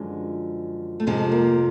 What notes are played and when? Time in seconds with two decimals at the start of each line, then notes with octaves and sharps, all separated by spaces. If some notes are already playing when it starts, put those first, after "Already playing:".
Already playing: F#2 D3 F3 G#3
1.00 A3
1.07 F2 C3 F3 G#3
1.32 A#3